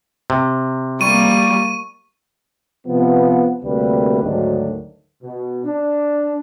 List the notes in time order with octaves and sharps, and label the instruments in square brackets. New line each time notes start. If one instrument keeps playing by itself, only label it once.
[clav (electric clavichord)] C3
[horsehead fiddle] G3 A#3 [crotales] C#6 D#7
[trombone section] C3 F3 B3
D2 C3 G3 A#3 B4
D2 G#2 D#3 F#3 D4
[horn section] B2
D4